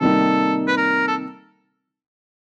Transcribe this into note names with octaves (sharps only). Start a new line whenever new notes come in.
C3 D#3 G3 A#3 D#4 A4
B4
A#4
A4